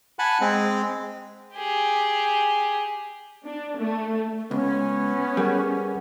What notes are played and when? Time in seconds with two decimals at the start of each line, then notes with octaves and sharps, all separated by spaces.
0.19 F#5 G#5 A5 B5
0.41 G#3 C4
1.55 G4 G#4
3.45 D4
3.78 A3
4.51 C#2 B3 C#4
5.37 G3 G#4 A#4 F#5